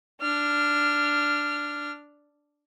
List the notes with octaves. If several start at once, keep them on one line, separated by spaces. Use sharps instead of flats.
D4 F6